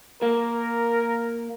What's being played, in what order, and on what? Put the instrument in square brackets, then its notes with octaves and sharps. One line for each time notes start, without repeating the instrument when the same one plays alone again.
[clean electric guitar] A#3 [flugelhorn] A#4